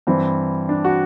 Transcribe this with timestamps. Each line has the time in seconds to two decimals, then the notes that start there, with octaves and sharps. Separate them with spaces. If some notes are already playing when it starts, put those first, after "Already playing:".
0.07 G2 E3 C4
0.69 D4
0.84 F#4